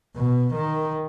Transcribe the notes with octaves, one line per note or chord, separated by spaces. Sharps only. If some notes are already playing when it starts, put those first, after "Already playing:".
B2
D#3